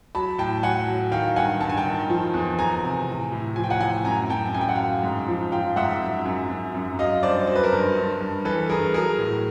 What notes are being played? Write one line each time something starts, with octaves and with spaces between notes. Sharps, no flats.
F#3 A5 B5
A2 G5 A5
F#3 F#5 G#5
F#3
D#3 F5 G5
G2 F#5 G#5
G2 A5
G#5
G5 A5
D#3
F3
E2
E2 G#5 A#5
C3
A2
A2
F3 G#5
G5
F#5 G#5
A2 F#5 G#5
F#2 G#5 A#5
F#2 G5 A5
F#2 G#5
G5
F#5
F#2 F5 G5
G#2
F3
F3 F5 G5
G#2 E5 F#5
F#2
F#2
F#2
F#2
F#3 D#5 F5
G2 C5 D5
F#3 C5
B4
A#4 C5
G2
G2
G2
E3 A4 B4
G2 G#4 A#4
F#3 G#4 A#4
A2